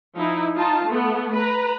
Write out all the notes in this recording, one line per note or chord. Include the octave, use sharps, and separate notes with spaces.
F3 D#4 E4
D#4 F4 A5
A3 B3
B4 A#5